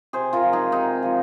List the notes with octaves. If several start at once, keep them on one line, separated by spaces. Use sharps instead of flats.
C3 G#4 C5
F4 A#4
F3 G#3
D#4 G#4
C3 D#4
F3 G#3